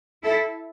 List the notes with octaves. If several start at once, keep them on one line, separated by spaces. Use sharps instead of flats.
E4 A4